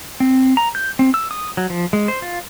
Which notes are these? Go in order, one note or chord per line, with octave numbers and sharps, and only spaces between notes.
C4
A#5
G6
C4
E6
D#6
F#3
F3
G#3
C5
F4